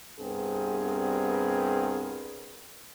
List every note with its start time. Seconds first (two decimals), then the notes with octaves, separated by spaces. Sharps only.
0.20 C2 G2 B3 C4 G#4 A#4